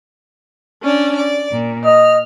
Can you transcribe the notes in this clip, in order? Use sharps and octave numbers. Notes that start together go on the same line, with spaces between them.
C#4 D4 D5
D5
A#2
D#5 F6